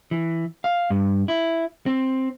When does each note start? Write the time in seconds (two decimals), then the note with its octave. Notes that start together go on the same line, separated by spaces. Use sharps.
0.11 E3
0.64 F5
0.90 G2
1.28 E4
1.86 C4